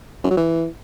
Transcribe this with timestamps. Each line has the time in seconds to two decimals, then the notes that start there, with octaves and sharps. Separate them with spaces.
0.24 F#2
0.30 F#3
0.37 E3